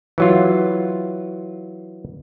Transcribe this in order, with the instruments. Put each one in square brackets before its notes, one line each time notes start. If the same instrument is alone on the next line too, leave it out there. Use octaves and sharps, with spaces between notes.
[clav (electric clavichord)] E3 F#3 F4